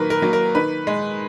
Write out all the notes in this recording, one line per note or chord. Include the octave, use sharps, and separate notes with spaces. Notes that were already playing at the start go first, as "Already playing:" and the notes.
Already playing: D#3 F#3 A#3 A#4 B4
A#4
F#3 A#3
A#4
D#3 B4
G#3